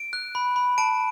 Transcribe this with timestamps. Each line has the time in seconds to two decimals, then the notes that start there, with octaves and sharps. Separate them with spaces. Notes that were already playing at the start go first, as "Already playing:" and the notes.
Already playing: D7
0.13 F#6
0.35 B5
0.56 B5
0.78 A5 D7